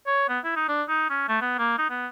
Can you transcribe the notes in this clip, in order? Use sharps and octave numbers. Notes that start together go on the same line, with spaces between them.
C#5
B3
E4
D#4
D4
D#4
C#4
A3
B3
A#3
D#4
B3